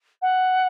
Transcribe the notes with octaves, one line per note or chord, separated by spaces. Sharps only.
F#5